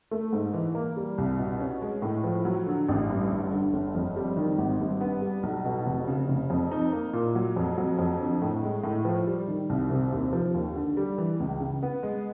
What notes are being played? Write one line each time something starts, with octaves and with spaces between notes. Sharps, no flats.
A3
G#2
E3
A#3
G3
C2
B2
C#4
G#3
A2
F3
F#3
D3
A1
G2
G1
D3
G1
F2
G3
D#3
G#1
G2
B3
G3
B1
B2
F1
C#3
F1
F2
D#4
A#3
A#2
F#3
F2
F#3
F2
D3
A2
G#3
A2
F3
G3
D#3
C2
C3
D#2
F3
D#2
D3
G3
E3
C#2
C#3
B3
G#3